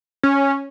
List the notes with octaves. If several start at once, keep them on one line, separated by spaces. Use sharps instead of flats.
C#4